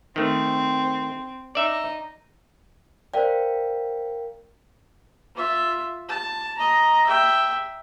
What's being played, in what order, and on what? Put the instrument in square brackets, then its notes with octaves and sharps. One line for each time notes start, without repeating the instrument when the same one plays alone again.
[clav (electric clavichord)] D#3 A3 [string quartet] C4
[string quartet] D#4 [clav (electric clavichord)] D5 E5
[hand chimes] A#4 F5 G5 [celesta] C5 D5
[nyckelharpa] F4 E5
A5
D#5 A#5
E5 G5